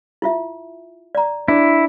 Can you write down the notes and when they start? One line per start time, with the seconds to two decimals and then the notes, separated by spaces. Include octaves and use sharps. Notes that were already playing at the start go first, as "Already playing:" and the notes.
0.22 E4 F4 E5
1.15 D5 A#5
1.48 D4 E4